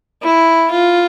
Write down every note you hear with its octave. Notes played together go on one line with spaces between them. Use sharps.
E4
F4